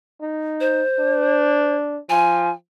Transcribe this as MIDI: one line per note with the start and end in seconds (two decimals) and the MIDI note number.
0.21 0.82 63
0.60 1.76 72
0.99 1.98 62
2.10 2.51 53
2.10 2.51 80